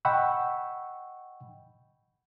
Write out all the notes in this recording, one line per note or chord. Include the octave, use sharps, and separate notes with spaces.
D#5 F#5 G5 B5 C#6 E6